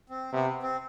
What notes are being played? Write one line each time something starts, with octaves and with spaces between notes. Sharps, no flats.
C4
C3 B3
C4